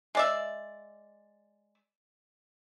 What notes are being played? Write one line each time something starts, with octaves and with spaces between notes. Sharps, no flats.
G#3 D5 E5